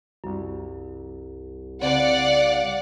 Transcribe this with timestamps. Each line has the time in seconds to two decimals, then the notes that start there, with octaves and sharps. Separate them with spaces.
0.24 C2 F#2
1.82 C#3 C4 D5 F5 F#5